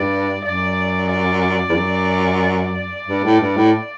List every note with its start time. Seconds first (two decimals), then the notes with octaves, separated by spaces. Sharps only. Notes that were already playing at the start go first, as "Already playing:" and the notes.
Already playing: G2 D5
0.44 F#2 D5
1.10 D5
1.69 E2
1.75 F#2
2.42 D5
3.07 G2
3.24 A2
3.40 G2
3.56 A2